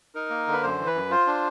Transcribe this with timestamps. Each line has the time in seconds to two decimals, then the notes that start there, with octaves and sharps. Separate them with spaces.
0.15 D#4 A#4
0.30 A#3
0.47 D3
0.53 B4
0.63 F#2 C5
0.79 E3
0.86 B4
0.95 F#2
1.10 F4 C5
1.27 D4